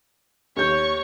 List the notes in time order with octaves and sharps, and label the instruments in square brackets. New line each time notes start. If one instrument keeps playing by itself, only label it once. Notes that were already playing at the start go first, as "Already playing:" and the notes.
[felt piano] D#2 G6 [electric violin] C#5 C#6